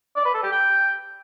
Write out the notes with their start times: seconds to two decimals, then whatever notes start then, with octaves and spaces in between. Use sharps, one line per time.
0.16 D5
0.25 B4
0.34 A4
0.43 G4
0.52 G5